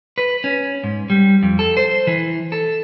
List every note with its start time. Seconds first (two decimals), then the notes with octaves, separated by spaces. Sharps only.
0.18 B4
0.44 C#4
0.84 G#2
1.10 G3
1.43 F2
1.59 A4
1.77 C5
2.07 E3
2.52 A4